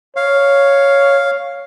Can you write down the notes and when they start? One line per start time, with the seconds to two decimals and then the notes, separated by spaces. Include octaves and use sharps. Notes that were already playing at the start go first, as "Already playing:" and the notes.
0.16 C#5 F5